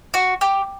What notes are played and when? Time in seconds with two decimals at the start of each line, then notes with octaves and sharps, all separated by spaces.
0.14 F#4
0.41 G4